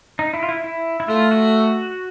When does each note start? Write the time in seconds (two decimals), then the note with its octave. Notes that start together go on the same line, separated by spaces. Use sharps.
0.19 D#4
0.34 E4
0.43 F4
0.49 E4
0.64 E4
1.00 E4
1.08 A3 F4
1.31 F#4